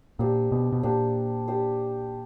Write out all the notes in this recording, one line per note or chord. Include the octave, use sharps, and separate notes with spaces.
A#2 D4 G4 C5
B2
B2
A#2 D4 G4 C5
D4 G4 C5